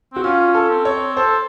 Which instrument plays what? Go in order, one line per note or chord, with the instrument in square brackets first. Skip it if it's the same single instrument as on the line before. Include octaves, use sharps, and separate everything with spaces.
[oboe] C4 [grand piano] F#4
[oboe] C#4 [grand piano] F4
[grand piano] A4
[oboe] C4
[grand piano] C#5
[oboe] A4 [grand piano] C5